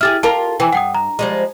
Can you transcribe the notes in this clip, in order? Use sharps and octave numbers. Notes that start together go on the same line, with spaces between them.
E4 G4 G#4 F6 A6
F4 G4 A#4 A5
E3 G5 G#5
G2 F#5 G5 D#6
A#5
F3 G3 G#3